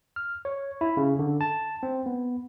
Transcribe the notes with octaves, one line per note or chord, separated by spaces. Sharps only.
F6
C#5
E4
C#3
D3
A5
C4
B3